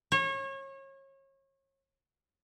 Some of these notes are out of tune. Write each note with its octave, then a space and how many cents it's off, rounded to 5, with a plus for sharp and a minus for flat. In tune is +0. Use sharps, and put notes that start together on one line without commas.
C#5 -30